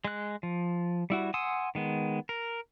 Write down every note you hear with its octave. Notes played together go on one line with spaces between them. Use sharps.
G#3 F#6
F3
G3 E4 F#4
F#5 G#5 C6 D#6 E6
D#3 G#3 B3
A#4